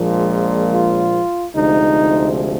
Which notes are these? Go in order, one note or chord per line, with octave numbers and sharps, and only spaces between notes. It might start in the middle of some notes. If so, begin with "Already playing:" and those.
Already playing: A#1 A#2 F3 G#3
F4
D2 C3 F3 G#3 D#4